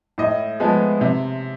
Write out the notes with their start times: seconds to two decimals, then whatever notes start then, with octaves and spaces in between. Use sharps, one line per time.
0.18 A2 D#5
0.60 F3 G#3 B3
1.01 C3